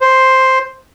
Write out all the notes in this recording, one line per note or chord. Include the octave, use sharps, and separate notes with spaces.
C5